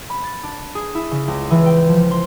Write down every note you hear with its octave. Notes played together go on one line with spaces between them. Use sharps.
B5
A6
D4
G#4
E4
C#3
C#2
E3
G5
F3
C6